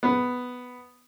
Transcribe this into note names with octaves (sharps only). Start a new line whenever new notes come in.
B3